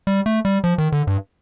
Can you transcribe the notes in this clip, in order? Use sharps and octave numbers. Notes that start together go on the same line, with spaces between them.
G3
A3
G3
F3
D#3
D3
G2